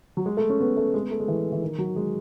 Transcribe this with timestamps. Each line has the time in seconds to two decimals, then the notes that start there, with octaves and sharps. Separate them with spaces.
0.17 F#3
0.26 G#3
0.37 A3
0.49 C#4
0.60 B3
0.77 A3
0.94 G#3
1.02 B3
1.11 A3
1.20 G#3
1.28 E3
1.52 E3
1.62 D#3
1.78 F#3
1.96 G#3